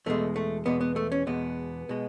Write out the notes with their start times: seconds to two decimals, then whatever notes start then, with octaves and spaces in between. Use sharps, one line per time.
0.06 E2 B2 G#3 A3
0.36 A3
0.66 E2 B2 G#3 B3
0.81 B3
0.96 A3
1.12 C#4
1.27 E2 B2 G#3 B3
1.89 B2 G#3